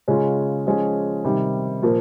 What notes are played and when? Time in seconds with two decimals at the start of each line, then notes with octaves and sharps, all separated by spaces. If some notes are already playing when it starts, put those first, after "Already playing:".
0.08 C#3 G#3 C#4 F4 G#4
0.67 F3 G#3 C#4 G#4
1.24 C3 D#3 G3
1.82 A#2 F3 A#3